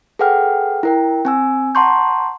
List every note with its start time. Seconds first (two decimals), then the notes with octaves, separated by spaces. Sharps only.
0.19 G#4 A4 B4 F#5 G5 F6
0.83 E4 A#4 G5
1.25 C4 G#5 E6
1.75 F#5 A5 A#5 C6 C#6 G6